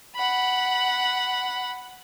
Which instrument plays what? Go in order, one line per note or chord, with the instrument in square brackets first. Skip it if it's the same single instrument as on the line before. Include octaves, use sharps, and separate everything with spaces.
[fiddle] F#5 B5